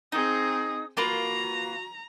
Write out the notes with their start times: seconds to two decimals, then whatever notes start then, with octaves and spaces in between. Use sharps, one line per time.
0.12 C4 D#4 G#4 D#6
0.97 A#3 F4 F#4 B4 A#5